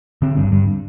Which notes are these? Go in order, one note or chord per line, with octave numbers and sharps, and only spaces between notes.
D3 C4
G2
G2